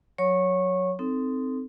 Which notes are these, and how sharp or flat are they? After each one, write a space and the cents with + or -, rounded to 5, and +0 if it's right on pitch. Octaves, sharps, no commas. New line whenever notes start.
F#3 -20 C#5 +0 C#6 -20
C4 -10 D#4 +0 A4 +0